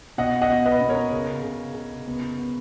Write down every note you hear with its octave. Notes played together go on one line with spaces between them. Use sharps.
B2 D#5 F#5
D#5 F#5
B2
B4 D#5
B2
A#4 C#5
C#3
C#3
C#3
B3
B3